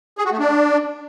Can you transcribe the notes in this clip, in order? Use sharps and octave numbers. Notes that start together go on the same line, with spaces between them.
G#4
F#4
A3
D4